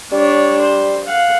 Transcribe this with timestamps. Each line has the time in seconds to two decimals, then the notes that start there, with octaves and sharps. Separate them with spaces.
0.12 G3 D4 C#5
0.62 C5
1.05 F5 F#5